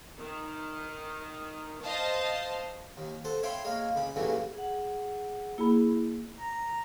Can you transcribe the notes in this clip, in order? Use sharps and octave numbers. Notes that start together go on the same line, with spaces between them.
D#3
C5 D#5 F5 A5
D#2
A4 C5 F#5
C#5 E5 F5 G5 B5 C6
G#3 A#3 C#5 F5
C#2 C#3 B5
G2 A#2 C#3 E3 F#3 A3
G#4 F#5
A#3 E4 G#4 B5
A#5